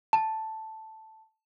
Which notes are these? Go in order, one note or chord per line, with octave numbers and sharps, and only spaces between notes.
A5